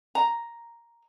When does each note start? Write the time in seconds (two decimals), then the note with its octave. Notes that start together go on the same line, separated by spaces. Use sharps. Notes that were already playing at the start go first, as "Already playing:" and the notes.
0.15 A#5